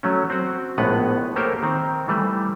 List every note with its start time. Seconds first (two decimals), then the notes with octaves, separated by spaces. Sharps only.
0.03 F#3 A3 C#4
0.30 C4 F#4
0.78 A#1 A2 G#3 B3 B4 F#5
1.36 A3 A#3 G4 A#4 C5 C#5
1.63 D#3 C4
2.08 E3 G3 A3